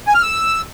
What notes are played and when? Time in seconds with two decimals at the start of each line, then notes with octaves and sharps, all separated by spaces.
0.07 G#5
0.15 F6
0.22 E6